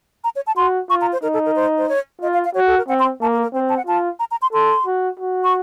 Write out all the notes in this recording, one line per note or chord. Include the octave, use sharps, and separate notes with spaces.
A#5
C#5
A5
F#4 C6
F4 C#6
A#5
C5
D#4 A#4
A4
A#4
C5
C5
C#5
F4 D#5
F5
F5
F#4 C#5
A4
A#4
C4 F#5
C6
A#3 A5
A#4
A#4
C4 C5
A5
F#5
F4 A5
A#5
A#5
C6
A4 C6
F#4
F#4
C#6